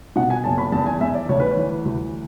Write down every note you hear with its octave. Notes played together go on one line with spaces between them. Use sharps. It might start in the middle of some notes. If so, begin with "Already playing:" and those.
B2 F#5
G#5
F#1 A5
B5
E2 A5
G#5
E2 E5
D5
D2 C#5
B4
C#5
E3
D2